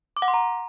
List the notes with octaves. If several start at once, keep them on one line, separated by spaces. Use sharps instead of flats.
D6
F#5
C6
A#5